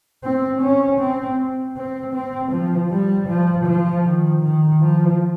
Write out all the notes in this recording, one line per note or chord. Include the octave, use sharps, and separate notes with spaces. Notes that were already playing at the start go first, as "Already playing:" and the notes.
C4
C#4
C4
C4
C4
F3
G3
F3
F3
D#3
D#3
F3